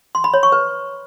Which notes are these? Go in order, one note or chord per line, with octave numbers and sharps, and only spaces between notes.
C6
B5
C#5
C#6
B4